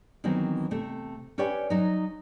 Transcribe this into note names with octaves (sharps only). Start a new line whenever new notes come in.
D#3 E3 F#3 B3 C4
C3 A3
C#4 G4 B4 C#5 D5 G5
F#3 D#4